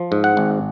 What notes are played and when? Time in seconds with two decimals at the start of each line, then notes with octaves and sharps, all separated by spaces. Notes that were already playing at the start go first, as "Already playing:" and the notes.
Already playing: F3
0.12 G#2
0.24 F#5
0.37 G#1